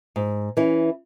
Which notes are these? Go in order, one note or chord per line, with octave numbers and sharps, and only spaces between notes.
G#2
E3 C#4 E4